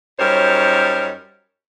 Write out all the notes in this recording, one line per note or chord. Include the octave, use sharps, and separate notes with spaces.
F#2 G3 D#4 A#4 C5 C#5